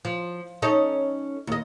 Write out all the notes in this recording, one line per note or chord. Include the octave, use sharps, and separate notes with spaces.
F3
C#4 D#4 A4
D#2 D#5